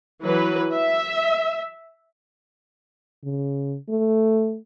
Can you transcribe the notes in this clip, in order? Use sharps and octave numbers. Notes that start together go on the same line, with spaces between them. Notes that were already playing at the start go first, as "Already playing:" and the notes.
E3 F#3 B4
E5
C#3
A3